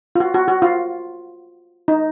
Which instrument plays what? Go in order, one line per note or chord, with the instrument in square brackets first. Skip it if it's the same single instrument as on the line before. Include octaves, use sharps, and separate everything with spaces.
[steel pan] F4
F#4
F#4
F#4
F4
D#4